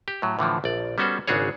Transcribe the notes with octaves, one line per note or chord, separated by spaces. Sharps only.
G4
A2 F#3
A2 D3 E3 F3
A#1 D5
G3 B3 C#4 F#4 A4 C5
G#1 C#3 D4 F#4 G#4 C#5